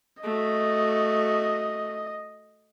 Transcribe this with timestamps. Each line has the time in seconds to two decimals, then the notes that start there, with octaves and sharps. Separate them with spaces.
0.23 A3 F#4 D#5